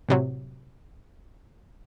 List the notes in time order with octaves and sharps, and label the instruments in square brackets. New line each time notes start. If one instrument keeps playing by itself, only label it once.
[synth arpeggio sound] A2 C3 F#3